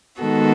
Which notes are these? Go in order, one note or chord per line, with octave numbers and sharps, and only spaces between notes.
D#3 G#3 B3 F#4 A4